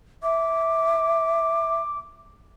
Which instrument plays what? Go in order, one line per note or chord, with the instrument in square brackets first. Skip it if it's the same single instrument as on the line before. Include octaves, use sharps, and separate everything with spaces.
[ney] E5 [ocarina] D6